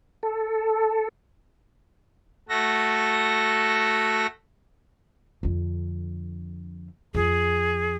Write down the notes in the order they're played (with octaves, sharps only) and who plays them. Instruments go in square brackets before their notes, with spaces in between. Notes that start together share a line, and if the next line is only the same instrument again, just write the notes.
[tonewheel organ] A4
[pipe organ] A3 F#4 A4 A#6
[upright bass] F2 D3
[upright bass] F2 [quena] G#4